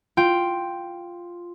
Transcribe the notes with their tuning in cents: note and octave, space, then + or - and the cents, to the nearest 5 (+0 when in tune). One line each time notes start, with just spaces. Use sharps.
F4 +0 G5 +0